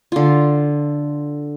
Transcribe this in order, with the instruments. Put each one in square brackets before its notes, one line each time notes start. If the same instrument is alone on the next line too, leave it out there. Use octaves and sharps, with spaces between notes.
[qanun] D3 F4